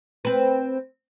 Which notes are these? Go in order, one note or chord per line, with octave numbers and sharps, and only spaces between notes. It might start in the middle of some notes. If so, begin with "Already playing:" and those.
C4 B4